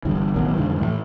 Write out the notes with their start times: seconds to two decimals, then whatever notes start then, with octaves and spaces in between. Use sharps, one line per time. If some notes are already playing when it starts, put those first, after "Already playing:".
0.05 G1 G2 D3 E3
0.36 A1 B2 D#3 F#3
0.57 F2 G#2 D3 E3
0.80 A2 E3 F#3 A3